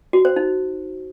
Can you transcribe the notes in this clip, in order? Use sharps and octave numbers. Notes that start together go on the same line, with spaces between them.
F#4
C5
D#4